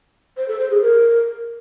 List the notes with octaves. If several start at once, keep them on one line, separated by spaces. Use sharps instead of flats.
C5
A4
C5
G#4
A#4